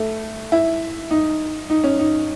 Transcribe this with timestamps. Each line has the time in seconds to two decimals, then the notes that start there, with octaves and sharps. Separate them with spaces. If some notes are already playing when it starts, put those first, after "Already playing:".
Already playing: A3
0.52 E4
1.11 D#4
1.70 D#4
1.84 C#4
1.99 D#4